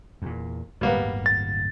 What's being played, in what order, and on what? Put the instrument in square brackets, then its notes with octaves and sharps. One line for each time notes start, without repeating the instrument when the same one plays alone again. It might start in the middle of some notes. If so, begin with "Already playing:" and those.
[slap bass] E2 A#2
[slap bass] D1 G1 [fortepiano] G3 A#3 B3
[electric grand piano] A6